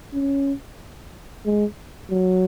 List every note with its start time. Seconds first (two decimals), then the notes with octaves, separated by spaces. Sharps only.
0.14 C#4
1.45 G#3
2.10 F#3